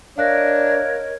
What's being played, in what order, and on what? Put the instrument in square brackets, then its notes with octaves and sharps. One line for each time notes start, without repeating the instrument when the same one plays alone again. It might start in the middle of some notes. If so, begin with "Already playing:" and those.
[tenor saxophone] D4 [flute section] A#4 C#5 D#5 [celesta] F5 F#6 A#6